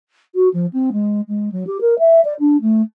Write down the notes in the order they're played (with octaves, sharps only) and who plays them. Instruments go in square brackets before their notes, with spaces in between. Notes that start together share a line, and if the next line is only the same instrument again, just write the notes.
[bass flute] F#4
F3
C4
G#3
G#3
F#3
G4
A#4
E5
D5
D4
A3